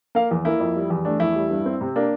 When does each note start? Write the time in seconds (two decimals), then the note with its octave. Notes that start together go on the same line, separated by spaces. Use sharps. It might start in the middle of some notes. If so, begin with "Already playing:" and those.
0.15 A#3 F5
0.31 E2
0.45 A#3 E4
0.60 F2
0.75 G3
0.90 E2
1.05 A3 D4
1.20 E2 E4
1.35 G3
1.51 G2
1.66 C4
1.81 C3
1.96 A#3 D4